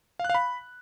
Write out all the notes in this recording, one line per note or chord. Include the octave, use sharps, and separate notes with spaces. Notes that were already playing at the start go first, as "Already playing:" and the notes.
F5
F#6
F5
B5